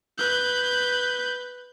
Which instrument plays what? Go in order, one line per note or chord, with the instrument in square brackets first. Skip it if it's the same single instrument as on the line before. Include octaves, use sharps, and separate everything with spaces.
[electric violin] B4 G6